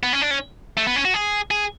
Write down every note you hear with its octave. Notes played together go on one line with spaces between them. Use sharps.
B3
C#4
D4
C#4
A3
B3
C#4
F#4
G#4
G#4